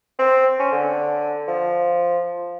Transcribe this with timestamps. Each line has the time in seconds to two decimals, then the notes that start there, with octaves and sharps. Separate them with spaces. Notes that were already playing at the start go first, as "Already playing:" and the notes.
0.19 C4
0.59 C#4
0.72 D3
1.48 F3